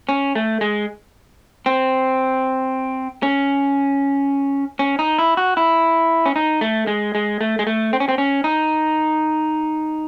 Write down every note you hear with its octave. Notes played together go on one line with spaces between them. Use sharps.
C#4
A3
G#3
C4
C#4
C#4
D#4
E4
F#4
E4
C#4
D#4
A3
G#3
G#3
A3
G#3
A3
C4
C#4
C4
C#4
D#4